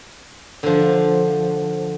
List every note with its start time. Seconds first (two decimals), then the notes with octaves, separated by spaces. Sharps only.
0.63 D3 F3